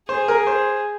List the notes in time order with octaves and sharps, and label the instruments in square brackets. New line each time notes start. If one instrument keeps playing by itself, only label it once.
[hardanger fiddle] G#4 [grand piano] C5
[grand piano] A#4
C5